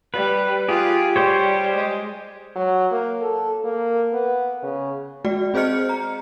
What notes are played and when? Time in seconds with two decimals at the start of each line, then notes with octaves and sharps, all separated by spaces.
0.14 G3 B4
0.68 F4 G4 G#4
1.16 G3 G4 C5 C#5
1.76 G#3
2.55 F#3
2.91 A#3
3.21 A4
3.64 A#3
4.13 B3
4.63 C#3
5.25 G#3 F#4 D5
5.54 C4 G#4 C5 D#5 F6 C#7
5.89 A#5